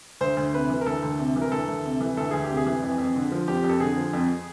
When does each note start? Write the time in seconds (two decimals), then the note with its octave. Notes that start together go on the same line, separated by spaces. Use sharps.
0.21 D2 C5
0.37 D2
0.54 C3 B4
0.70 E3
0.81 A#4
0.86 D2 A4
1.03 D2
1.19 C3
1.36 E3
1.41 A#4
1.52 D2 A4
1.68 D2
1.85 C3
2.01 E3
2.17 D2 A4
2.31 D2 G#4
2.44 G4
2.50 C3
2.57 G#4
2.67 E3
2.83 F2
2.98 F2
3.16 D3
3.32 F3
3.48 F2 G4
3.64 F2
3.69 A4
3.80 D3 G#4
3.97 F3
4.13 F2